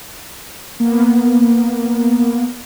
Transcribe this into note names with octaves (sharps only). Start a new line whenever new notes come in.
A#3 B3